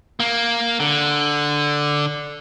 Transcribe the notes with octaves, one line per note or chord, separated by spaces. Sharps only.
A#3
D3